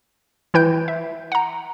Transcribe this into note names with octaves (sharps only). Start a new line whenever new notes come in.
E3 E4 B4 G5 G6
E5
F#5 A#5